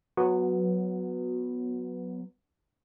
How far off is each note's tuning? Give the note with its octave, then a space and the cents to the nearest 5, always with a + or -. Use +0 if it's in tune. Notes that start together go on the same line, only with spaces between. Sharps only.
F#3 -15 B3 +0